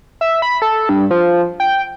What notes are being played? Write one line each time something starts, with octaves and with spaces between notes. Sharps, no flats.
E5
B5
A4
G2
F3
G5